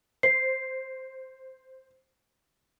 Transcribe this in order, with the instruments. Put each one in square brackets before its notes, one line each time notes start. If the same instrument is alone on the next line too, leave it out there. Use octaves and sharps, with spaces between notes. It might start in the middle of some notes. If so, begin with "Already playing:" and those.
[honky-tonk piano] C5 [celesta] C7